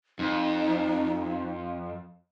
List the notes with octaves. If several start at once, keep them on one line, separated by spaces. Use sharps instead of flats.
F2 D#4